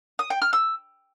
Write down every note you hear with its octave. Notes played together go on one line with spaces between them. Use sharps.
D#6
G5
F6
E6